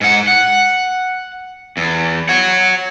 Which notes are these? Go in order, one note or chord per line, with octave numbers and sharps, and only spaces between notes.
G#2 F#5
F#5
E2
C#5 F#5